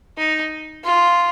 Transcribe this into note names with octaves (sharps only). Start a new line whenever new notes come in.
D#4
F4